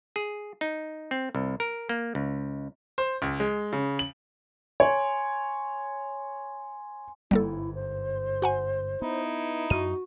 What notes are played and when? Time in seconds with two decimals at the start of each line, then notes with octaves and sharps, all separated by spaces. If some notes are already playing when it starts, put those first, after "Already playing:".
0.16 G#4
0.61 D#4
1.11 C4
1.35 C2
1.60 A#4
1.89 A#3
2.15 C#2
2.98 C5
3.22 C#2
3.40 G#3
3.73 C#3
3.99 F#7
4.80 C#5 G#5 C6
7.31 G1 G#2 G3 A#3 E4 A4
7.74 C5
8.42 F#4 F#5 G#5
9.02 B3 D#4 E4
9.70 F#2 F#4 D#7